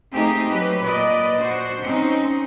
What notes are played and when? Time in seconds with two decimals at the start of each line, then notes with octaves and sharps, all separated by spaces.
0.14 A3 A#3 C4 D#4 G4 G#4
0.49 F#3 G4 B4
0.83 A#2 B4 D5 D#5
1.39 D4 F#4 C5
1.83 C4 C#4 D#4